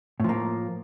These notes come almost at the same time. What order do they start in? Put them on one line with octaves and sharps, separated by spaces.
A2 F3 A#3